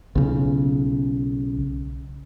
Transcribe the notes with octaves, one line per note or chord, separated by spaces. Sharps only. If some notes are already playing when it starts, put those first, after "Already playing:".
B1 C#3